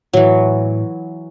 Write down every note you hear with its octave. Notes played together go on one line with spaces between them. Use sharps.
A2 E3 F#3